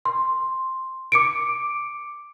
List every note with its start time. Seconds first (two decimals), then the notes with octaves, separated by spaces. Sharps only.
0.05 C6
1.12 D6 C#7 D7